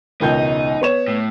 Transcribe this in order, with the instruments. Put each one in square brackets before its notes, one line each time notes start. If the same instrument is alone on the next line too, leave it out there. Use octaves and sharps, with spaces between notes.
[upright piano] E1 C#2 G6 [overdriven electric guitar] D#4
[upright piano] B3 C#5 E7
[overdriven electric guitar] A2